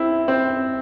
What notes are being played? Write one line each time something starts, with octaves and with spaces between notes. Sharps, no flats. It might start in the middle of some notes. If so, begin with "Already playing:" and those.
Already playing: C4 E4
C4